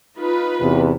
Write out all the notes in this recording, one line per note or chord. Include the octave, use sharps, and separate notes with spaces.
D#4 F4 B4
E2 C3